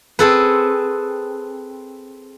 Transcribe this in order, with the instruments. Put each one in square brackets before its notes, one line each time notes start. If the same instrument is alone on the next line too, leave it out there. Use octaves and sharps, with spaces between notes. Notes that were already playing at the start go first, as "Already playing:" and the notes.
[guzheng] C4 G#4 A4 B4